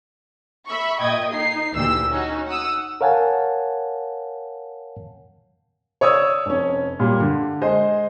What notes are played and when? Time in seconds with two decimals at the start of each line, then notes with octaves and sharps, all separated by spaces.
0.67 E5 B5 C#6
1.02 A#2 D#5 G5 G#6
1.33 D#4 C7
1.74 D2 A#2 E3 G4 E6
2.08 C#4 D#4 F#4
2.47 F#5 D#6 E6
3.01 A#4 C#5 F5 F#5 G#5 A5
6.01 C#5 D5 D#6 E6 G#6
6.46 F1 C#4
6.99 A#2 G3
7.20 D3
7.61 G#3 G#4 C5 D#5